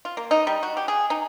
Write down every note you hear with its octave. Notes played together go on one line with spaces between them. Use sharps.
F4
A#3
D#4
G3
F#4
G4
G#4
D#4